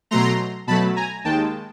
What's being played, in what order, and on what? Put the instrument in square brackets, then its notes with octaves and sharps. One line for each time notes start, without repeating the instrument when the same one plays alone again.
[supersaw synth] B2 F#3 A3 A#5 C6
B2 F#3 A3 A5 B5
G#5 A#5
D#2 D#3 G#3 G5 A5